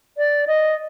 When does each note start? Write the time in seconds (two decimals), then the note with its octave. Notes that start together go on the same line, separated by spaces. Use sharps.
0.17 D5
0.47 D#5